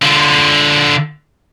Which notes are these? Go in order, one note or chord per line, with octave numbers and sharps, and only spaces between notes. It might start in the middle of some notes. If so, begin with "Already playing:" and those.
D3 F4